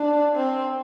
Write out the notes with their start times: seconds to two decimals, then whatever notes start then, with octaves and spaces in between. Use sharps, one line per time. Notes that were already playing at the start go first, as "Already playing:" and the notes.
Already playing: D4
0.36 C4